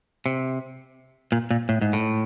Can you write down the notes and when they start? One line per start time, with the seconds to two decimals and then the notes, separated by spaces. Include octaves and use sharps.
0.26 C3
1.32 A#2
1.51 A#2
1.69 A2
1.81 G#2
1.93 A2